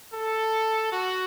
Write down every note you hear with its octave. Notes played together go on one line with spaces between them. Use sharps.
A4
F#4